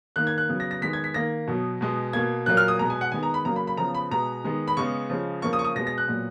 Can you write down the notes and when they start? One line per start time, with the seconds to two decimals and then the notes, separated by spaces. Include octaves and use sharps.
0.16 D#3 A#3 F#6
0.27 G#6
0.38 F#6
0.49 C#3 F#3 B3
0.60 A#6
0.71 A#6
0.81 D#3 G#3 B3 B6
0.93 G#6
1.04 B6
1.14 D#3 A#3 A#6
1.47 B2 F#3 B3
1.81 B2 G#3 B3
2.13 B2 A#3 G#6
2.46 A#2 F#3 A#3 F#6
2.57 F6
2.68 D#6
2.79 B2 G#3 B3 A#5
2.90 G#5
3.01 F#5
3.12 D#3 G#3 B3 G#5
3.23 A#5
3.34 B5
3.45 C#3 F#3 A#3 A#5
3.56 B5
3.67 B5
3.77 C#3 F3 B3 A#5
3.95 B5
4.11 B2 G#3 B3 A#5
4.44 D#3 G#3 B3
4.68 B5
4.77 C#3 G#3 B3 C#6
5.10 C#3 F3 G#3
5.42 C#3 F3 A#3 C#6
5.53 D#6
5.59 C#6
5.65 D#6
5.75 B2 G#3 B3 A#6
5.87 A#6
5.98 F#6
6.08 A#2 F#3 B3